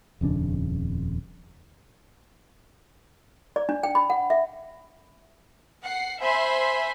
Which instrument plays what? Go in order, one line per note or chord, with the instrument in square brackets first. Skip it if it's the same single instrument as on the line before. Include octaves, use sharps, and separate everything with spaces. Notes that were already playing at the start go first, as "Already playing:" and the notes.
[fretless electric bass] D#1 F2 C#3 D4
[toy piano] D5
D4
G5
B5
F#5
E5
[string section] F#5 C7
C5 E5 G#5 B5 C6